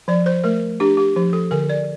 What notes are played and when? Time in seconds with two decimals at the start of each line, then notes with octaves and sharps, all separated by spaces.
0.08 F3 D5
0.26 C5
0.44 A3 A#4
0.80 D4 G4
0.97 G4
1.16 F3 G4
1.33 A4
1.51 D3 A#4
1.69 D5